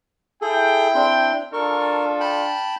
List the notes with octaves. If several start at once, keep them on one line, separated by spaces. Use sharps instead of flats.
E4 G#4 A4 G5
C4 D4 C6
D4 F4 A4 A#4 C#6
G5 A5 B5